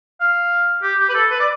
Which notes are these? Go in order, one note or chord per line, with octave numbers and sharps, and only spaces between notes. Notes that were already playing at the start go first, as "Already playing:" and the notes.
F5
G4
G4
B4
A4
B4
D5